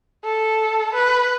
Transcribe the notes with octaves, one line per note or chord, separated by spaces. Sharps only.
A4
B4